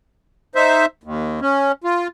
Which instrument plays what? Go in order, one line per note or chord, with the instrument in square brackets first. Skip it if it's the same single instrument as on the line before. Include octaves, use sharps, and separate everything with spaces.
[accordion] D#4 C5 E5
D#2
C#4
F4